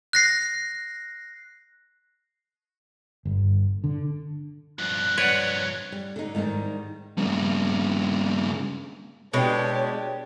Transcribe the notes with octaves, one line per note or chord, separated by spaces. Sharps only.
F#6 A#6 C7
G1
D3
G2 F3 F#6
B4 C#5 D5 F#5
G3
D3 D#4
G#2 D#3 G3 D#4
G2 C#3
B2 G#3 D4 G4 C#5